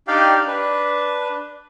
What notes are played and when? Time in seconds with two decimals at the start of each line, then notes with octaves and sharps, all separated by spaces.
0.08 D4 D#4 G4 D5 F5 G5
0.48 D4 B4